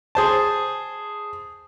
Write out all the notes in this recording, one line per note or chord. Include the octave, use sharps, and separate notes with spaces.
G#4 C5 A5